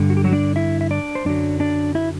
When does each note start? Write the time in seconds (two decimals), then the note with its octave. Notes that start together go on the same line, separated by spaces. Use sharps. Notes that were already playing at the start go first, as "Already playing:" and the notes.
Already playing: G2 D3
0.10 F#4
0.17 G4
0.24 F#3 F#4
0.33 D4 D5
0.56 E4 E5
0.81 E5
0.91 D4 D5
1.15 C5
1.25 F#2 D3 F#3 D4 D5
1.60 D4 D5
1.95 E4 E5